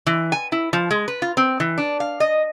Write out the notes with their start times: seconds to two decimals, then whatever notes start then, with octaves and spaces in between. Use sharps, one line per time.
0.07 E3
0.32 G#5
0.52 E4
0.73 F3
0.91 G#3
1.08 B4
1.22 F4
1.37 C4
1.60 E3
1.78 D4
2.00 F5
2.20 D#5